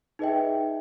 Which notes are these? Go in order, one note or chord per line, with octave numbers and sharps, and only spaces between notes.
D#4 G#4 B4 D#5 E5 G5